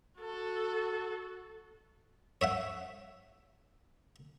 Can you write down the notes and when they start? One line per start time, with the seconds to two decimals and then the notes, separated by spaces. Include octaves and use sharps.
0.20 F#4 A4
2.41 C#5 E5 F#5